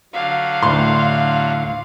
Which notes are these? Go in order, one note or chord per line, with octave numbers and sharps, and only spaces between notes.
D3 F#3 F5
D2 A2 C6